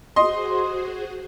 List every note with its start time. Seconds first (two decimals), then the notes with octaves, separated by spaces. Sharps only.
0.16 F#4 G#4 C5 D#5 C6